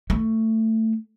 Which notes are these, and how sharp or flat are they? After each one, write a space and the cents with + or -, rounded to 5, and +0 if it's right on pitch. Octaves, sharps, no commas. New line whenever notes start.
A3 +15